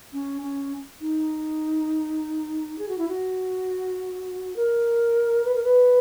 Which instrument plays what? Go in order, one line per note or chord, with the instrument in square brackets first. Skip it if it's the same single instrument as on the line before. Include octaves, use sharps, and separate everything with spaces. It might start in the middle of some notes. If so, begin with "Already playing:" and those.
[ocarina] C#4
C#4
D#4
G#4
F#4
E4
F#4
A#4
B4
A#4
B4